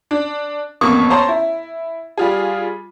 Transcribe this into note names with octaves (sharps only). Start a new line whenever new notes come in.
D4
A1 F2 A#3 B3 C#6
C5 C#5 A5 A#5 C6
E4
G3 F4 G#4